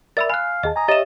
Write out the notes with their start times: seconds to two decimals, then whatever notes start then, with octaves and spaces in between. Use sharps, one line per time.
0.17 A#4 D5 E5 B5 E6 A6
0.30 F5 G#5 B5 F#6
0.63 D#2 G#4 D#5 A5
0.76 G#5 A#5 D#6
0.88 G4 C#5 D#5 E5 A6 E7